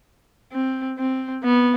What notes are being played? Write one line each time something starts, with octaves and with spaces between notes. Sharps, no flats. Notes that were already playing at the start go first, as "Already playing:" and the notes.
C4
C4
B3